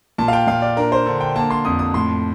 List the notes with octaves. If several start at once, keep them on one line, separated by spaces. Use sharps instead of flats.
A#2 A5
F5
G5
A#2 F5
D5
D4 A#4
C5
D3
G5
A#3 A5
C6
F2 D#6
D#6
A2 C6